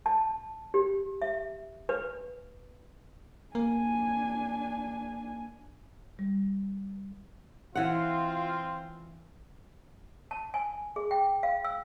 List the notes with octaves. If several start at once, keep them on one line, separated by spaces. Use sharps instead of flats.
A5
G4
E5
B4
A#3 D4 G#5
G3
E3 C4 F4 F#5
A5
G#5
G#4
G5
F5
E6